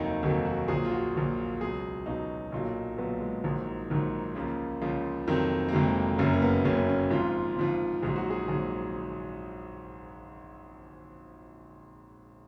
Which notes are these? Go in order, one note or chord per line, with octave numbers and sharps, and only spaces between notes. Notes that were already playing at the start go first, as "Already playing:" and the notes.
Already playing: F1 D#2 D#3 F#3 D#4
F1 D#2 D#3 F#3 F#4
F#4
A#1 A#2 F#3 G#4
F4
F#4
A#1 A#2 F#3
C#2 B2 F#3 G#4
C#2 B2 F#3 D#4
B1 A#2 F#3
B1 A#2 F#3 B3
G#3
A#1 G#2 D#3 F#3
A#1 G#2 D#3 F#3
C#2 C#3 F3 A#3
C#2 C#3 F3
F1 F2 D#3 F#3
A#3
F1 F2 D#3 F#3 G#3
F#1 F#2 C#3 F#3 A#3
A#3
B3
F#1 F#2 C#3 F#3 C#4
B3
C#4
G#1 G#2 F3 F4
G#1 G#2 F3
A#1 G#2 F#3 G#4
F#4
G#4
A#1 G#2 F#3 G#4